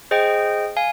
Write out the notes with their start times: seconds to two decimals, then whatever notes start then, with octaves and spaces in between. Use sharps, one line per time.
0.11 G#4 C5 D#5 G5
0.77 F5 G#5